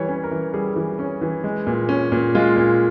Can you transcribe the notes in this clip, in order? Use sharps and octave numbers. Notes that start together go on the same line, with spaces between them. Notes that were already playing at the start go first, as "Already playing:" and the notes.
Already playing: E3 G3 C#5
C#4
A#4
E3
G3 G#4
E3
C#4
E3
G#3
A#2
C#4
A#2
G#3 F4
A#2